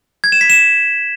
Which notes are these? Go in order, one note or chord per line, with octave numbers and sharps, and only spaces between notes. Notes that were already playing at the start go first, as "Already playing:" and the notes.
G#6
E7
B6
E7